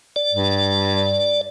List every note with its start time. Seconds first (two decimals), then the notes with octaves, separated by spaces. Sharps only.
0.16 D5
0.33 G2